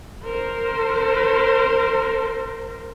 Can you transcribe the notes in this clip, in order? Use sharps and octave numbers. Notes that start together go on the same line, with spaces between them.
A#4 C5